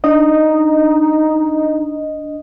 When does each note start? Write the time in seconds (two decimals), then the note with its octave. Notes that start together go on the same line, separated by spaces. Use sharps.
0.04 D4 D#4 D#5